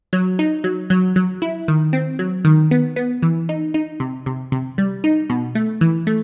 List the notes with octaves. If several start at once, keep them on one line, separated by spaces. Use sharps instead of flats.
F#3
D#4
F#3
F#3
F#3
E4
D#3
C4
F#3
D#3
B3
B3
E3
D#4
D#4
C3
C3
C3
G3
D#4
B2
A3
E3
A3